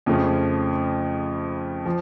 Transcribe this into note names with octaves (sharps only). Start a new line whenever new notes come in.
F2 C#3 F3 A3 C#4
F3